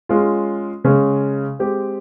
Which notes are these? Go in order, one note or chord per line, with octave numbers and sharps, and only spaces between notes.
G#3 C#4 F4
C#3 G#3 C#4
G#3 C4 G4